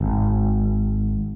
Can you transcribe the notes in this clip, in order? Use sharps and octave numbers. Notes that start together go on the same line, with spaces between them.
G#1